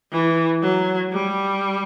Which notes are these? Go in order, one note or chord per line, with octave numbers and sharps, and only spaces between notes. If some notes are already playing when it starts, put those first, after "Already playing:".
E3
F#3
G3